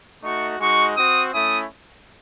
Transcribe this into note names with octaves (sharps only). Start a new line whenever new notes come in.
A3 D#4 F#4 C#6
G#3 D#4 F#4 C#6
C4 F#4 D#6
A3 C#4 E4 D#6